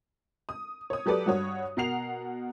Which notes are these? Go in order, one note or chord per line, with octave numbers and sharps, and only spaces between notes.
D#6
C#5 D#6
F#3 G4 A4 B4 D5
G2 F#4 C#5 D#6
B2 A#4 F#5 C7 F7